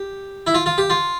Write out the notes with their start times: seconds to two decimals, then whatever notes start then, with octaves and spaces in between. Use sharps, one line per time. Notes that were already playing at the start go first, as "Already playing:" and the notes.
Already playing: G4
0.47 E4
0.54 F4
0.66 F4
0.78 G4
0.90 F4